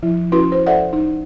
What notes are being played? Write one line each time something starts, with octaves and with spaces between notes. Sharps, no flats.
F3 E4
C#4 E4 F#4 B4 C6
C5
A4 C5 D5 E5 F#5
D#4